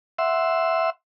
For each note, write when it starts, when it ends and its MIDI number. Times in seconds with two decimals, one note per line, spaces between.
0.19 0.90 76
0.19 0.90 78
0.19 0.90 84
0.19 0.90 88